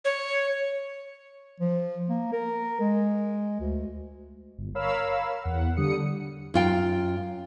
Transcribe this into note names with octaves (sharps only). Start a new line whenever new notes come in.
C#5
F3
A#3
A#4
G#3
D2
G1
A#4 C#5 F5 B5 E6
E2 F#5
D3 G3 D#6 C#7
F#2 F4 G5